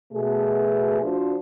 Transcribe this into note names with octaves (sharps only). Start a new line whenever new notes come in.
B2 A3 G#4
F3 D4 F4 F#4 C5